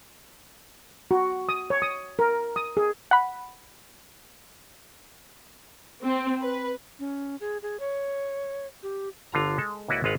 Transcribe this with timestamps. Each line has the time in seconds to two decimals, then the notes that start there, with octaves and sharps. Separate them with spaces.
1.11 F#4
1.49 D#6
1.70 C#5
1.82 D#6
2.19 A#4
2.56 D#6
2.77 G#4
3.11 F#5 B5
6.04 C4
6.42 B4
6.99 C#4
7.41 G#4
7.63 G#4
7.80 C#5
8.83 G4
9.32 G1 D3 F4 A#5
9.58 G#3 A4
9.88 C#2 A#3 E4 F#4 B4 D5
10.04 G#1 G#3 F4 B4 F5 F#5